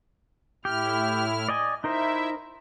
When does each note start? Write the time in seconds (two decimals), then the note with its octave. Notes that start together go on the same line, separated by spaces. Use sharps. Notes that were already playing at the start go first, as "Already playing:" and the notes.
0.65 A2 E4 G4 F6
1.49 D5 D#5 G#5
1.84 D#4 E4 A#4 C5 E5